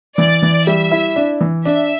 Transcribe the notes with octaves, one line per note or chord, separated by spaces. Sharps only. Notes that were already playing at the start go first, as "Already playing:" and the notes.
E3 D5
E3
G3 E5
E4
D4
E3
D4 E5